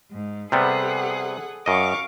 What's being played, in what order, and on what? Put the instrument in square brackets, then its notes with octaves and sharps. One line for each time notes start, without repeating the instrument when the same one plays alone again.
[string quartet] G#2
[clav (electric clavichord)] C3 G3 B3 [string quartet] G#4 A4 F#5
[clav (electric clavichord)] F#2 D#5 [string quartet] F5 C#6 D6